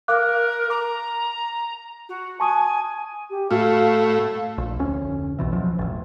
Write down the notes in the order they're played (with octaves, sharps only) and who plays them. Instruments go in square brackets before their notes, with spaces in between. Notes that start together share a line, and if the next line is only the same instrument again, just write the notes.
[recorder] A#4 [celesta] F5 D6 F#6
[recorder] A#5 [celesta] D6
[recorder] F#4
[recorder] G#5 [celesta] A5 C#6 D#6
[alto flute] G4
[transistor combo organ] A2 A3 [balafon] F#4 [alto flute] F5
[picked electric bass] A#1
F1 D2 C#4
B1 B2 E3
F3 F#3
E1 A1